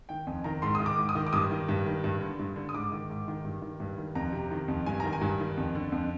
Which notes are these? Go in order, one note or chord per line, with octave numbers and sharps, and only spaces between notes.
D#3 G5
F2 G#5
D#3 A#5
G#2 C6
D#6
D#3
D6
G#2
D#6
D#3
D6
G2 D#6
D#3
G2
D#3
G2
D3
G2
D3
D#6
G#2 D6
D#3
G#2
D#3
G2
D#3
G2
D#3
F2 A#5
C3
D#3
F2
G2 G#5
D#3 A#5
G#5
G2
D#3
F2
D3
F2